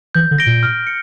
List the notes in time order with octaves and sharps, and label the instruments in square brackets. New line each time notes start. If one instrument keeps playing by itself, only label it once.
[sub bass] E3 [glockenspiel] G6
[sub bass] D3
[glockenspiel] A#6 D7 G7
[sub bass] A#2
[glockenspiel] F6
C#7